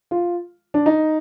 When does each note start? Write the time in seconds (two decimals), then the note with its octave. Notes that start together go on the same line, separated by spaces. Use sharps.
0.11 F4
0.74 D4
0.86 D#4